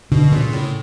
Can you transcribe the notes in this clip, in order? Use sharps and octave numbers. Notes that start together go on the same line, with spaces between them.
B2 D3
A#2 C#3
A2